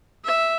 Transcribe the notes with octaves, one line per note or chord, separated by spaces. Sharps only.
E5